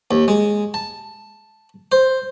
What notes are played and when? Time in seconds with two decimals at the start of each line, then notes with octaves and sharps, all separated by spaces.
0.11 D#2
0.28 G#3
0.74 A5
1.92 C5